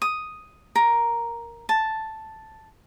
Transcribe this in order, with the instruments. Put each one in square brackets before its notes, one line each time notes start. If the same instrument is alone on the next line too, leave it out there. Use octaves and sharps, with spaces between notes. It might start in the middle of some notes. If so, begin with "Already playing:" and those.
[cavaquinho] D#6
A#4
A5